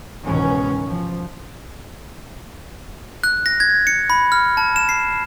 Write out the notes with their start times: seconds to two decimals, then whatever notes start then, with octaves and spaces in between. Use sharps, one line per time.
0.25 C#2 G#2 B2 D#3 E3 C#4
0.86 F3
3.24 F#6
3.46 A#6
3.60 G#6
3.87 C#7
4.10 B5
4.32 F6
4.57 A5
4.76 E7
4.89 C7